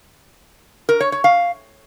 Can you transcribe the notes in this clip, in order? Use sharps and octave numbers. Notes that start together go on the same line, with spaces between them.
A#4
C#5
C#5
F5